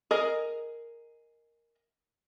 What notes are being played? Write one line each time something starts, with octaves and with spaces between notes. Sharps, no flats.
G#4 A#4 D#5